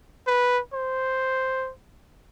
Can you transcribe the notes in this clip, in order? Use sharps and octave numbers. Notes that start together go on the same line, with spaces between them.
B4
C5